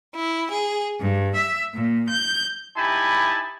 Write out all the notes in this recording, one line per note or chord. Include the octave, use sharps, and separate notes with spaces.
E4
G#4
G2
E5
A#2
G6
D#4 E4 G4 G#5 A5 B5